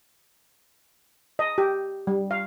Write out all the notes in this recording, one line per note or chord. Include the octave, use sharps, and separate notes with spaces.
D#5
G4
G3
F5